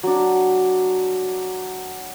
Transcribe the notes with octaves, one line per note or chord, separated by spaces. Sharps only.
F#3 D4